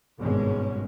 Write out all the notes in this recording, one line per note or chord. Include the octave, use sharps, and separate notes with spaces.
G#1 G2 B2 G#3 C#4